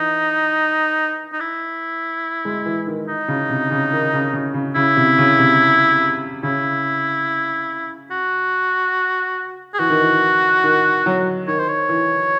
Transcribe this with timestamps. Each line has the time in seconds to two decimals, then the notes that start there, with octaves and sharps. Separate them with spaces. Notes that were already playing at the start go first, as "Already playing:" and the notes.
Already playing: E3 D#4
1.33 D#4
1.41 E4
2.45 G#3
2.66 E3
2.87 D#3
3.08 D#4
3.28 C#3
3.49 C3
3.71 C#3
3.92 D#3
4.13 C#3
4.33 C#3
4.54 C#3
4.75 C#3 E4
4.97 C3
5.18 C#3
5.39 C3
6.43 C#3 E4
8.11 F#4
9.74 G#4
9.79 E3 F#4
9.90 D#3
10.01 E3
10.64 D#3
11.06 F#3
11.48 D#3 C#5
11.59 C5
11.69 C#5
11.89 E3